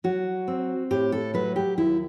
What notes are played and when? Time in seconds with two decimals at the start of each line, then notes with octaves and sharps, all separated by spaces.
0.04 F#3 F#4
0.48 C4
0.91 A2 G4
1.12 A4
1.34 F#3 B4
1.56 G4
1.77 D#2 E4